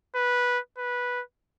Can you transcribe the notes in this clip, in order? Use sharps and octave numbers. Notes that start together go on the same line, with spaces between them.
B4
B4